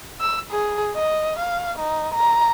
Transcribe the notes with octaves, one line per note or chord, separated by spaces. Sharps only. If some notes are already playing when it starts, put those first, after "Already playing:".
E6
G#4
D#5
F5
D#4
A#5